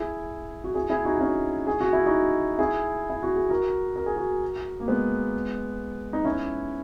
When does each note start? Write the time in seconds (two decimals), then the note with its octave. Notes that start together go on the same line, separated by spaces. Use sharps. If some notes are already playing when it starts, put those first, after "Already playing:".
Already playing: E4 G#4
0.64 F#4
0.75 E4 G#4
0.90 E4 G#4
1.05 D#4 F#4
1.16 F#4
1.20 C#4 E4
1.67 G#4
1.81 F#4
1.93 E4
2.06 D#4 F#4
2.58 E4 G#4
3.10 E4
3.23 F#4
3.36 G#4
3.50 F#4 A#4
3.96 A#4
4.06 G#4
4.16 F#4 A#4
4.80 A#3
4.88 G#3 B3
6.13 D#4
6.25 C#4 E4